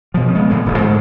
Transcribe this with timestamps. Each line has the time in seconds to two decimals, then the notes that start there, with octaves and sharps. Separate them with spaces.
0.14 B2 F3
0.34 C#3 G#3 B3
0.50 A2 D3 G#3
0.66 D#1 A#1 E2
0.78 G#2 D3 A3